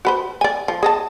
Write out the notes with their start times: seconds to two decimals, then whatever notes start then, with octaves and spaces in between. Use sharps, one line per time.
0.05 F#4 B4 C5
0.41 D5 G#5
0.68 F3
0.83 G#4 D#5 A5